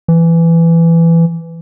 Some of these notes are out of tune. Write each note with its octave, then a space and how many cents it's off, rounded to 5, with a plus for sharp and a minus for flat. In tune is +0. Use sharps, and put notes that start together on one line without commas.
E3 +15